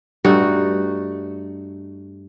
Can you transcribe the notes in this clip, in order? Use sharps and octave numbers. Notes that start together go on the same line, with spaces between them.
G2 A3 D#4 F#4